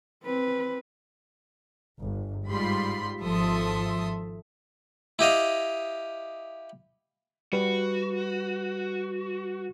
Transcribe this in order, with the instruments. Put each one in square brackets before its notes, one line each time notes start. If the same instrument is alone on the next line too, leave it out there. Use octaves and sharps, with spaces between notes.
[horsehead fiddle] C4 B4
[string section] G1
G#2 G3 F4 B5 C6
G#1 F3 A4 E5 C6 D#6
[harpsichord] E4 G4 D#5 F5
[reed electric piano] G3 B4 [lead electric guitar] F#4